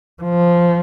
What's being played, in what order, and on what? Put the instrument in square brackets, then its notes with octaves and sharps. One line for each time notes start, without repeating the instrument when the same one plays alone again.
[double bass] F3